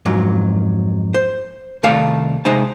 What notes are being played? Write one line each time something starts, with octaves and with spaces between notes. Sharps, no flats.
F2 G#2 F#3
C5
C2 D#3 A3 D5 F5 A5
C3 G#3 D#4 C5 A5